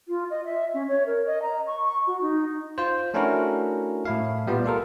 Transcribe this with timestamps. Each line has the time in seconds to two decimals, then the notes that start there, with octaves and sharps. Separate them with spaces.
0.08 F4
0.30 D#5
0.45 E5
0.74 C#4
0.88 C#5
1.06 A#4
1.26 D#5
1.42 A#5
1.67 C#6
1.83 C#6
2.07 F#4
2.21 D#4
2.78 F4 C5
3.14 A3 C#4 D4 E4 F#4 A#4
4.05 A2 E4 F5
4.47 A#2 G3 B3 F4
4.64 A#3 F4 A4 A#4